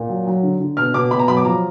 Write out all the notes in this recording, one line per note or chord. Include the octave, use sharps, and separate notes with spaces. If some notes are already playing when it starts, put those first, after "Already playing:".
Already playing: A#2
F#3
F#3
D3
D3
B2 F6
B2 D6
B2 B5
A#5
F#3 B5
D6
F3 A#5